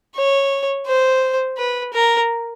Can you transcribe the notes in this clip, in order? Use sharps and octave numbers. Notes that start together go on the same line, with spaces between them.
C#5
C5
B4
A#4